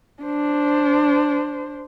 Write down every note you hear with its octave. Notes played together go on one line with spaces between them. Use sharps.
D4 C5